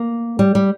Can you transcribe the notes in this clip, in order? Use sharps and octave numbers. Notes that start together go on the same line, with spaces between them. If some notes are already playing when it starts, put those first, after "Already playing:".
Already playing: A#3
G3
G3